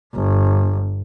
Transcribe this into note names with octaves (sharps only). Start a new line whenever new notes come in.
G1